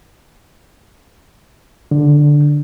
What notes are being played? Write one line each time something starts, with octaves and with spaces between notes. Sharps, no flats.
D3